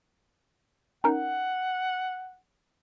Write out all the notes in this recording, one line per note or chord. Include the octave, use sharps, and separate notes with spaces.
C#4 D#4 A#4 F#5